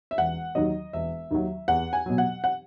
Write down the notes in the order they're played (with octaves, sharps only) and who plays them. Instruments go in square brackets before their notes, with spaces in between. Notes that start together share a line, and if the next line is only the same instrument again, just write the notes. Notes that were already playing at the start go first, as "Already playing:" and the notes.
[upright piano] E5
E1 F#5
D#2 D#3 F#3 D#5
E1 E5
D#2 D#3 F#3
E2 F#5
G#5
B2 F#3
F#5
F#5